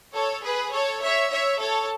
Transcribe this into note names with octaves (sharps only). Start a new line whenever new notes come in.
A4 C#5
G#4 B4
A4 C#5
C#5 E5
C#5 E5
A4 C#5